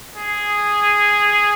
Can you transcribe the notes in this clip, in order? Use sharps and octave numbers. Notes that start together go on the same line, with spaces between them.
G#4